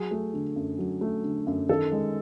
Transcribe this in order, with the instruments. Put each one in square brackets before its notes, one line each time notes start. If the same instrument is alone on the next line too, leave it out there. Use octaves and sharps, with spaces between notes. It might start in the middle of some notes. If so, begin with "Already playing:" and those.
Already playing: [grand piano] F#3 G#4
A3
D3
F#2
F#3
A3
D3
F#2
D#3 A4
G#3